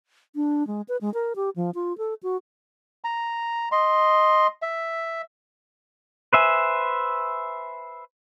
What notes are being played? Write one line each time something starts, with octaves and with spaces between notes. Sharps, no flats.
D4
G#3
B4
G#3
A#4
G4
F3
F4
A4
F#4
A#5
D#5 C6
E5
B4 C5 E5 G#5